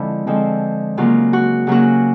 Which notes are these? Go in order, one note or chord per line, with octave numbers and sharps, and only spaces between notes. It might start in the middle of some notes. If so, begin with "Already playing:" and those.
Already playing: D3 F3 G#3 C4 E4
D3 F3 G#3 C4
C#3 F#3 A#3 C#4 F4
F#4
C#3 F#3 A#3 C#4 F#4